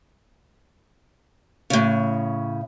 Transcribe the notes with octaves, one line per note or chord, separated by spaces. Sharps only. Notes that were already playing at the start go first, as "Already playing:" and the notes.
A2 C#3